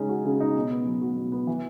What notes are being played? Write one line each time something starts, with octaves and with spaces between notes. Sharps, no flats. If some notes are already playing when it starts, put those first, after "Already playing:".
Already playing: C#3 G#3 C#4 D#4
F#4
C#3
D#4
B2
B3
F#3
F#4
B2
B3
E3